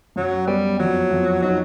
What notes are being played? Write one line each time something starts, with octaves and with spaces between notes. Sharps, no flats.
F#2 F#3
G3 B3
F2 F#3
F2
F#3 D#4